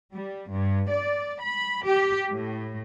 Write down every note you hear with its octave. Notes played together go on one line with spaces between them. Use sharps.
G3
G2
D5
B5
G4
A2